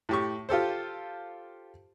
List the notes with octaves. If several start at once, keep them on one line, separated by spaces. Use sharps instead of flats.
A2 G4 C#6
F4 G4 A4 C5